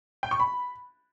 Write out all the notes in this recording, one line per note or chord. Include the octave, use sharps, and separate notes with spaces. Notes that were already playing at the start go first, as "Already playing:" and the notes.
G5
C#6
B5